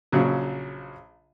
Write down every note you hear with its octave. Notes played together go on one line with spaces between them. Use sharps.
A#1 C#3 F#3